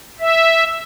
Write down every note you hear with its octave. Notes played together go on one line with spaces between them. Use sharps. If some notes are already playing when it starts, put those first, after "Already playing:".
E5